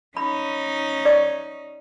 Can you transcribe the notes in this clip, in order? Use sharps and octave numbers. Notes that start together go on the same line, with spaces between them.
C#4 D#4 B5
D5 C#6